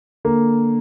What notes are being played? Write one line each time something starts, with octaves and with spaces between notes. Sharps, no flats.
D3 A#3